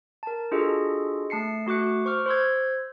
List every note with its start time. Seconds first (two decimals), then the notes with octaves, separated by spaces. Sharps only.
0.23 A#4 A5
0.51 D4 F4 F#4 G#4 A4 D#5
1.30 A3 A5 C7 C#7
1.67 A3 F#4 D6 F#6 C#7
2.05 C5 C#6 D6 F6
2.26 C5 C6 E6 G#6